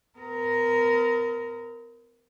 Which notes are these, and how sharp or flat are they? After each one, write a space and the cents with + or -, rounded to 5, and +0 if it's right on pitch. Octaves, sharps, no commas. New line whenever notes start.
B3 +45 A#4 +0